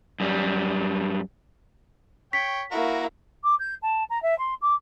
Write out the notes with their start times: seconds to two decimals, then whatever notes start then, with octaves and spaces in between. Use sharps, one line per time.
0.20 F#2 G3
2.33 C#5 G5 B6
2.72 A#3 E4 F#4 A#4
3.44 D6
3.59 G6
3.82 A5
4.10 A#5
4.22 E5
4.38 C6
4.62 D6